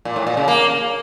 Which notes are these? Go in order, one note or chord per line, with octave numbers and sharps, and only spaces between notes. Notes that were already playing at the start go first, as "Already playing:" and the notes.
A#2
A2
A#2
C#3
A#3